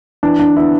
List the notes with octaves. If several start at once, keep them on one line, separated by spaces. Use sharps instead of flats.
E3 D4
D4
B3 E4